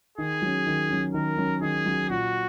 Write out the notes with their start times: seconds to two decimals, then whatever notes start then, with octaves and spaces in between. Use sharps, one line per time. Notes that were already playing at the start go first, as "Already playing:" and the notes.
0.18 D#3 G#4
0.42 F#3 C#4
0.67 D#3
0.90 F#3 C#4
1.14 D#3 A#4
1.38 F#3 C#4
1.62 D#3 G#4
1.86 F#3 C#4
2.10 A#2 F#4